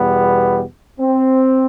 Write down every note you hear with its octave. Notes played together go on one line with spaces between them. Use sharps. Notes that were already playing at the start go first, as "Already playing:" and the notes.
Already playing: E2 B2 G3 B3
C4